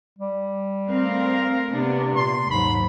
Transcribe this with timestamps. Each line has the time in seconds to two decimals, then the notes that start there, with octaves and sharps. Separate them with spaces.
0.18 G3
0.88 A3 C4 A#4 F5
1.70 C3 A#3 B3 D4
2.16 A#2 C6
2.51 D#2 G#2 F#3 B5